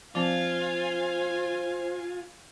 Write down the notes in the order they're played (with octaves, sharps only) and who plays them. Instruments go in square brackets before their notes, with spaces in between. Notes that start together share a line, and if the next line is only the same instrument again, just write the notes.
[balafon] F3 C4 [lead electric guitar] F4 [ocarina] C5 [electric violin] F5 G#5